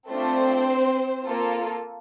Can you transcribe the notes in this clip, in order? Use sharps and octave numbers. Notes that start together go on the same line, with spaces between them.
A3 C4 D4 F4 A4 C5
A#3 F4 A4